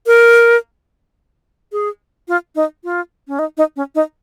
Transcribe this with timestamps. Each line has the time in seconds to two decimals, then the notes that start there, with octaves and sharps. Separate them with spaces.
0.07 A#4
1.72 G#4
2.28 F4
2.55 D#4
2.84 F4
3.28 C#4
3.39 D#4
3.57 D#4
3.76 C#4
3.95 D#4